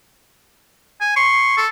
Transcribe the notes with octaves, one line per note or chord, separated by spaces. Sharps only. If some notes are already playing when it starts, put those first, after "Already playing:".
G#5
C6 C#6
A4